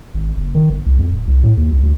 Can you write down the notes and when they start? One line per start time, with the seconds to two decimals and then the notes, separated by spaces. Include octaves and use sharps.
0.15 G#1
0.37 F#1
0.55 D#3
0.70 G1
0.86 C2
0.99 F2
1.10 D1
1.27 C2
1.43 A2
1.57 D#2
1.71 C2
1.83 D2